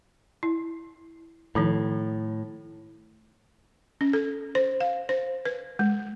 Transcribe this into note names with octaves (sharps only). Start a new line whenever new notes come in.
E4
A2 D#3 F3 D#4
C#4
A4
C5
F5
C5
B4
G#3